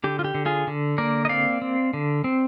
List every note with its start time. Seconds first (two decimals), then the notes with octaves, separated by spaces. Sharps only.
0.04 D3 G4
0.19 F4
0.24 G4
0.34 D3
0.46 F4 G#4
0.67 D3
0.98 A#3 A#4 D5
1.25 D#5
1.29 C4 D5 F5
1.62 C4
1.93 D3
2.24 C4